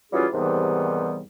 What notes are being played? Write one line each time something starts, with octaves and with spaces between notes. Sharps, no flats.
E3 F#3 G3 C#4 F4 G#4
D#2 G#2 C3 E3 G3 B3